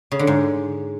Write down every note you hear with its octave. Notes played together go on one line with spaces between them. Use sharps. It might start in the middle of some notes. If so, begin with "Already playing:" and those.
C#3
D3
G#2